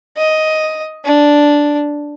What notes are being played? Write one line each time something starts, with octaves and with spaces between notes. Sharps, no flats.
D#5
D4